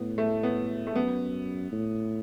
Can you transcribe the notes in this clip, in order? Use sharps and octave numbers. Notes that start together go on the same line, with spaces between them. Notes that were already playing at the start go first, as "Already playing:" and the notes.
Already playing: A2 B3
A3
B3
A3
F#2 B3
A2